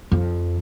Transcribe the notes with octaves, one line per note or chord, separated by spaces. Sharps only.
F2